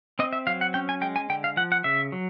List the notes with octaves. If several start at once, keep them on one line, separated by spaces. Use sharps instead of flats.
C4 D#5
E5
F#3 F5
F#5
C#4 G5
G#5
G#3 G5
G#5
D3 G5
F5
F3 F#5
F#5
C#3 E5
F#3